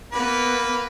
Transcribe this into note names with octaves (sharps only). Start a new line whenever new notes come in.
A#3 B3 B4